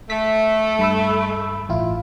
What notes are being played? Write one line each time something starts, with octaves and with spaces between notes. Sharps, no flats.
A3 B6
G2 B5 E6
A1 E4 F4